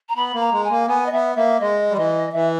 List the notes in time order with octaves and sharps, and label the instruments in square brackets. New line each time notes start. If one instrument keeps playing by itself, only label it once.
[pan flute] A#5
[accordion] B3 [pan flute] B5
[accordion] A#3
[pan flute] A#5
[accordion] G#3
[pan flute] G#5
[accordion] A#3
[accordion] B3 [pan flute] G#5
[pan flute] D#5
[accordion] B3 [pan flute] E5
[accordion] A#3 [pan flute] E5
[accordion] G#3 [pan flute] D#5
[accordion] G3
[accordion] E3 [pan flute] D#5
[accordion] E3 [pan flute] E5